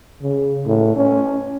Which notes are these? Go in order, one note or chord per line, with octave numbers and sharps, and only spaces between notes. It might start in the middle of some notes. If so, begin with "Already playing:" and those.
C#3
A2
C#4